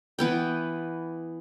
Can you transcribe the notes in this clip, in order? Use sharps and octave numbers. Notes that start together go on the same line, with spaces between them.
E3 B3 G5